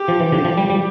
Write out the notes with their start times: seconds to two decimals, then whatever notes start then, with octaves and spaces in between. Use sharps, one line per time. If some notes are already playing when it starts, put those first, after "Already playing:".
Already playing: G4
0.08 F3
0.20 E3
0.32 D3 G4
0.45 F3
0.57 G3
0.70 G3